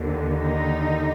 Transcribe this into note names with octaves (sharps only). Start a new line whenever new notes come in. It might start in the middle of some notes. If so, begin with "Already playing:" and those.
Already playing: D#2 D3
D#4